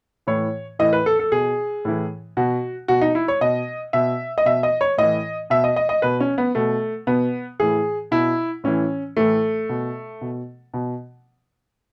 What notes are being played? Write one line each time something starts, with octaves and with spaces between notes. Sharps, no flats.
A2 E3 C#5
A2 E3 D#5
B4
A4
A4
B2 G#4
A2 E3
B2 F#4
B2 F#4
D#4
E4
C#5
B2 D#5
B2 E5
D#5
B2 E5
D#5
C#5
A2 E3 D#5
B2 E5
D#5
D#5
D#5
B2 B4
C#4
B3
B2 A3
B2 B3
A2 E3 G#4
B2 E4
A2 E3 C#4
A2 E3 A3
B2
B2
B2